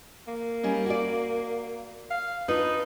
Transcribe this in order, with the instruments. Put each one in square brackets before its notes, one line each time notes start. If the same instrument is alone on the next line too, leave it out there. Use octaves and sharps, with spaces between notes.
[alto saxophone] A#3
[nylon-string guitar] G3 C#4 D#4
F#4 D5
[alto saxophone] F5
[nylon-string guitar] D4 F4 B4 [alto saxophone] D#4